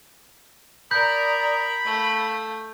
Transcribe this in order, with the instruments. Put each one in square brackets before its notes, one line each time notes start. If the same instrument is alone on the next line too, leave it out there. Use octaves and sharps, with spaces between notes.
[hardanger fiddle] A#4 [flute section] D5 A#5 D#6 [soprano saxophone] B5 [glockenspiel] G6
[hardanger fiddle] A3 [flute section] F5